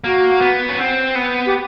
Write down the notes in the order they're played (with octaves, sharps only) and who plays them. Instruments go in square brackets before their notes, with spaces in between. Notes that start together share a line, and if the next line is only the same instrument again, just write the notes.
[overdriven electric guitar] A#3 [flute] F#4
[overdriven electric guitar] B3
C#4
C4
B3
[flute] G4